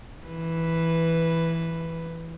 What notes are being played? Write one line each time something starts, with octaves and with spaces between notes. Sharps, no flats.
E3 B4